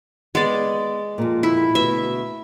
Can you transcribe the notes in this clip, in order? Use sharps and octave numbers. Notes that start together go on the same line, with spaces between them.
G#3 B3 D5 F#5
F2 A#2
E4
D2 B2 E5